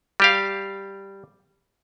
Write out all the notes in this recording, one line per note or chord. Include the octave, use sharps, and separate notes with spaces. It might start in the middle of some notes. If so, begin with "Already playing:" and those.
G3 G4 F5